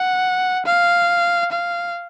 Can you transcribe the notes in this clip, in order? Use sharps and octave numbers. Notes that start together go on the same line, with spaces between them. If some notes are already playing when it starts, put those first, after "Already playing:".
Already playing: F#5
F5
F5